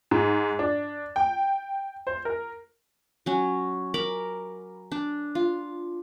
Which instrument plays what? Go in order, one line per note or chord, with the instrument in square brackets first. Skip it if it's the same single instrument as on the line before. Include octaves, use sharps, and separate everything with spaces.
[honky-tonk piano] G#2
D4
G5
C5
A#4
[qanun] F#3 C#4
A#4 B5 D6
D4
F4